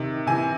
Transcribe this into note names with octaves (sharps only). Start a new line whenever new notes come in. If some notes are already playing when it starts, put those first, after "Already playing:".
Already playing: C3 D#3
C3 E3 G#5